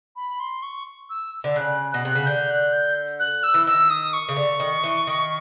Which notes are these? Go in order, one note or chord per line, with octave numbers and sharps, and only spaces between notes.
B5
C6
C#6
E6
D3
C#3 F#6
B2 F#6
C3
C#3
D3 G6
F#6
G6
F#6
E6
E3
D#3 E6
D#6
C#6
C#3
D3
D#3
E3
D#3